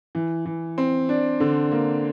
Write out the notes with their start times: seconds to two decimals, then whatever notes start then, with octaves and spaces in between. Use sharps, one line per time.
0.15 E3
0.45 E3
0.78 C4
1.09 D4
1.40 D3
1.71 A#3